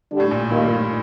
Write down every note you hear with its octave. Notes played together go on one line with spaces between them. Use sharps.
D3 G3 D4
A2
A#1 A#2
D#2 A2 D#3 A#3 F4
G2
A2